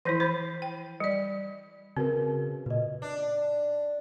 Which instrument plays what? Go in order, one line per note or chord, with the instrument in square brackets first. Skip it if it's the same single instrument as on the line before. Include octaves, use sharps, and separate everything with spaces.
[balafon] E3 F3 E4 [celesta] G6 C7 D#7
[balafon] C5 [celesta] B5
[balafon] G5
G3 D5
[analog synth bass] C#3 [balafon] C4 [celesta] F#4 A#4 B4
[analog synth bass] A#2 [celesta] B4 D#5
[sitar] D4